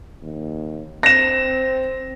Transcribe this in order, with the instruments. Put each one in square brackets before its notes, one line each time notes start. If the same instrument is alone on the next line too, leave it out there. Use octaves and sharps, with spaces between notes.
[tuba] D#2
[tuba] C4 [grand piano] A#6 E7